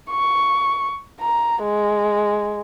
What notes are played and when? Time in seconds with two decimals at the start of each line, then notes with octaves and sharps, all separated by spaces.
0.11 C#6
1.20 A#5
1.63 G#3